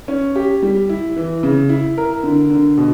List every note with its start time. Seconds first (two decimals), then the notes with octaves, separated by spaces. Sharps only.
0.08 C#4
0.36 G4
0.63 G3
0.89 E4
1.16 E3
1.43 C#3
1.69 E4
1.98 A#4
2.23 D3
2.50 D3
2.78 B2